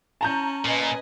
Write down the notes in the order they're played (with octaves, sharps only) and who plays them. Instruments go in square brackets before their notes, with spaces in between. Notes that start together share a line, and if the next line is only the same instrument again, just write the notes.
[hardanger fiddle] C#4 [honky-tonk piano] A5 A#5 G6
[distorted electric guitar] A#2 [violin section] B4 D#5 G#5